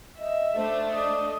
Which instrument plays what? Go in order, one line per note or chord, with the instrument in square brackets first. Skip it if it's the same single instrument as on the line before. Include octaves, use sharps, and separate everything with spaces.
[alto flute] D#5 [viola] E5
[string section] A3 D4 [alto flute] C5
[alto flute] D5 [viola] D#5